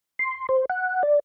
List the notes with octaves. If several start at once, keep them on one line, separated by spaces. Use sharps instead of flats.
C6
C5
F#5
D5